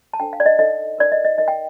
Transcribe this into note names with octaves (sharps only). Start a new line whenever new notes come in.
A5
D4 A4 C5 G5
F5
D5
D#5
D#4 A4 C5 D#5
D#4 A#4 D5
D#5
D#5
D#4 A#4 D#5
G5